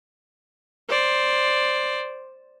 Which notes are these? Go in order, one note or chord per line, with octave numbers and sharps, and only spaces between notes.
C5 D5